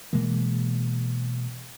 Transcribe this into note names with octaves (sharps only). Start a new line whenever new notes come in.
B2 E3 G#3 A#3